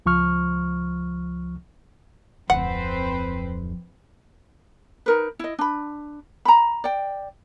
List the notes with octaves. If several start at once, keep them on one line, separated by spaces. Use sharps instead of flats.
C#2 F3 C#6 F6
D1 F2 C4 B4 C5 F#5
D#4 A#4 B4
E4 D#5
D4 B5
A#5 B5
D5 G5